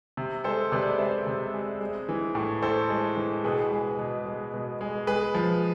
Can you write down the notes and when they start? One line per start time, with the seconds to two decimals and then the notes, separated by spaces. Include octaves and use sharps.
0.17 C3
0.44 G#3 A4 C5
0.72 C3 B4 D5
0.99 G#3 C5 E5
1.27 C3
1.53 G#3
1.81 G#3
2.09 E3
2.35 A2
2.62 A2 A4 C5
2.90 G#3
3.17 E3
3.44 B2 G#4 B4
3.71 G#3
3.99 B2
4.26 G#3
4.54 B2
4.81 G#3
5.07 G#3 G#4 B4
5.35 F3